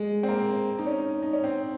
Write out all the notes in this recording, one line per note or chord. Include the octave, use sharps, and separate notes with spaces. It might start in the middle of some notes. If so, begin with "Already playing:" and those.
Already playing: G#3
C4
A#3
D#4
C#4
D#4
C#4
C4